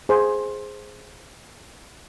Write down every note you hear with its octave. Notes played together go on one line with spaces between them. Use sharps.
G#4 C5